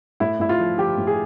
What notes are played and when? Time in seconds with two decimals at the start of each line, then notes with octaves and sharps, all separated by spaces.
0.20 A2 E4
0.40 A2 E4
0.49 F4
0.60 F3
0.78 F3 G4
0.98 A2
1.07 G#4